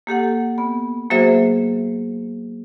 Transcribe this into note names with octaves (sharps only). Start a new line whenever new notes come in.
A#3 G4 A4 F#5
B3
F#3 A#3 F#4 G#4 C5 E5